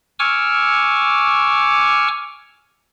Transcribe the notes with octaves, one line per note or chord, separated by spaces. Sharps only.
G#5 C#6 D6 E6 F6